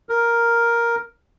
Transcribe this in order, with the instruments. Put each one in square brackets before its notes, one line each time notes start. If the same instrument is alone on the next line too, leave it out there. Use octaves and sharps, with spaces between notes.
[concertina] A#4